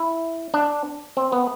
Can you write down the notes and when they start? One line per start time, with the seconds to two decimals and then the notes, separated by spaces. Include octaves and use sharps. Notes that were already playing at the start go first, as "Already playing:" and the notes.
Already playing: E4
0.54 D4
1.17 C4
1.32 B3